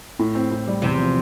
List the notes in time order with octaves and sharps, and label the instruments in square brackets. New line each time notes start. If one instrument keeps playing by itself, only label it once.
[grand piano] A2
C4
A2
G3
[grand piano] E2 [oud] C3
[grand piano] F3